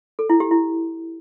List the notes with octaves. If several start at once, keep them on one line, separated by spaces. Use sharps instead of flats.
A4
E4
G4
E4